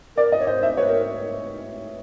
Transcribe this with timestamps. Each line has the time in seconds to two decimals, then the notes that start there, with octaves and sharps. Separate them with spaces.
0.16 A#4 D5
0.32 D#5
0.39 C#5
0.47 C5 D#5
0.63 E5
0.77 B4 C#5
0.89 A#4